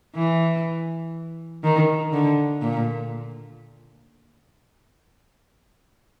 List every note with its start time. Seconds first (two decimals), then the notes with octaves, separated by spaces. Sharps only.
0.15 E3
1.64 D#3
2.12 D3
2.62 A#2